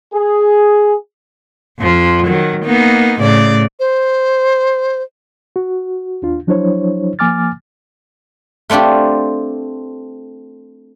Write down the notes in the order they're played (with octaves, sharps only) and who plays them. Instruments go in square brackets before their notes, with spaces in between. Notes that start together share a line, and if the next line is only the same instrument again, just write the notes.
[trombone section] G#4
[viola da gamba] F2 F3
D#3 F#3
A#3 B3 D#4
A2 C#3 D5
[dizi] C5
[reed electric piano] F#4
D#2 D4 F4
F3 F#3 D4 E4 C5 C#5
F3 A#3 G#5 D6 F6 A6
[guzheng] A3 C4 D4 F4 G4